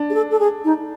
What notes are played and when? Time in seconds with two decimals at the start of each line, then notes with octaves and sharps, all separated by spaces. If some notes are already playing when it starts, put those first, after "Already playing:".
Already playing: D4
0.10 G#4
0.14 A4
0.31 A4
0.40 G#4
0.65 D#4